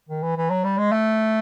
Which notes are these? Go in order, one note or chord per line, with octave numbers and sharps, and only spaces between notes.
D#3
E3
E3
F#3
G3
G#3
A3